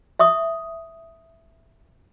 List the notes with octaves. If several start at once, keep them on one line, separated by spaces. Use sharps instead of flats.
E5 C#6 D#6